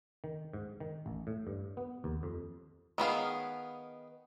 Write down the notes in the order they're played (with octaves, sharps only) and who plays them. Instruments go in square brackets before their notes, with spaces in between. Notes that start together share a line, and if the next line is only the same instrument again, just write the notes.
[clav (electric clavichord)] D#3
G#2
D#3
A1
A2
G2
B3
D#2
F2
[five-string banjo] D#3 B3 G#4 F5